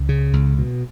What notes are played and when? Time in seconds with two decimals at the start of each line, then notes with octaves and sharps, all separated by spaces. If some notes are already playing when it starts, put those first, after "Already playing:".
Already playing: C#2
0.09 C#3
0.33 C#2
0.58 B2